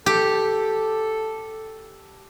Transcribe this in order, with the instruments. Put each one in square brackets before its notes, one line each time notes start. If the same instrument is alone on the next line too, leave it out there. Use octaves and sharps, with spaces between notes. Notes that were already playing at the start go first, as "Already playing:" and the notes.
[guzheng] G4 [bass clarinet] A4